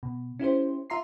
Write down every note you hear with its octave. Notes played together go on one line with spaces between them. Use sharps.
B2
C#4 E4 G4 C5
F4 E5 A#5 C6 C7